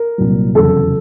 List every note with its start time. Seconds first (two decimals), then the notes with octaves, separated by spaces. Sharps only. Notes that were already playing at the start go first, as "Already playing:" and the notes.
Already playing: A#4
0.18 C2 A#2 F#3
0.55 F1 E2 C#3 F#3 A4